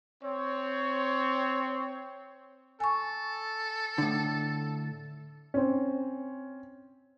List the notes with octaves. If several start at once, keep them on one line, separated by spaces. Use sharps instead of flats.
C4 C#5
A4 G#5 C#6
A2 D3
C4 C#4